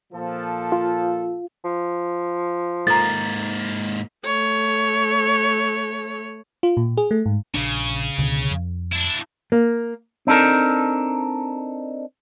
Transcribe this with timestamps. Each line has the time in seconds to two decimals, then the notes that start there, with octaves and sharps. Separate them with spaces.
0.13 A#2 F3 A4
0.72 F4
1.64 F3
2.87 G#2 A#3 A4 A#4 A#5 A6
4.25 A3 C#5
6.63 F4
6.77 A#2
6.97 G#4
7.11 A3
7.26 G#2
7.54 A#1 C#3 D4
8.18 C#2 B2 D3
8.51 F2
8.92 D4 E4
9.52 A#3
10.27 C4 D4 D#4 A4 A#4